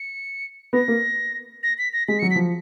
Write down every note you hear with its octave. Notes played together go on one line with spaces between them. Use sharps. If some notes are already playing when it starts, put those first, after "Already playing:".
Already playing: C#7
B3 A#6
A#3
A#6
B6
A#6
G#3 B6
C#7
F#3
B6
F3